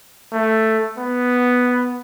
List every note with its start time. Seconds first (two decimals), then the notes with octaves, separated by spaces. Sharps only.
0.33 A3
0.98 B3